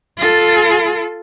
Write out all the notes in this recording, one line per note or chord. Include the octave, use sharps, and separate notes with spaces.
F4 A4